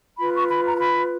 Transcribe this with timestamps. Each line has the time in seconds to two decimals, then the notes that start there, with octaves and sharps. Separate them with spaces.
0.19 F4 B4 B5
0.35 C#6
0.50 B5
0.66 A#5
0.76 A#5
0.81 B5